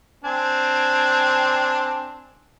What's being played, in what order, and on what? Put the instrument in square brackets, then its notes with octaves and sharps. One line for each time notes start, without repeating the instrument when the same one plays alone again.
[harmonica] C4 D4 G#5